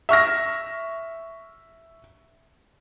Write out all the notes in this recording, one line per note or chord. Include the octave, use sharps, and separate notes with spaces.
E5 C#6 F6 A#6